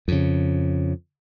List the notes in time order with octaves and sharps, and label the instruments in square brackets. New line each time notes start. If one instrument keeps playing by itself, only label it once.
[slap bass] F2 C#3